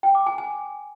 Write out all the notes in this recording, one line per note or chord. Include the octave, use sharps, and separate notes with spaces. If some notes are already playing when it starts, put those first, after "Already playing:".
G5
D6
G#5
G#5